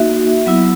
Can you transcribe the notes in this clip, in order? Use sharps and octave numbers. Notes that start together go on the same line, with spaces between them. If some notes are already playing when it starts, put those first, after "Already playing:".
Already playing: A#3 D#4 F#4 E5
F#3 B3 E4